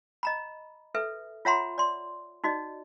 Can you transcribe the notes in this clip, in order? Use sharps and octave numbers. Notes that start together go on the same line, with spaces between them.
D#5 A#5 B5
A4 B4 E5
F4 C#5 E5 F#5 A#5 C6
D5 C6
D#4 F#4 D5 D#5